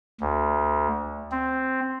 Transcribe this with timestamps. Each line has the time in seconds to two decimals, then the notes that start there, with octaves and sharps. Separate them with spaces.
0.21 D2
1.32 C4